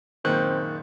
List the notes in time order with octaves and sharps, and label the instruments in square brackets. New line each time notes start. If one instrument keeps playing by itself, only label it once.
[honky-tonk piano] F#1 A#2 G6 [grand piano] D#3 [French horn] C4 [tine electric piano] C#6 F#6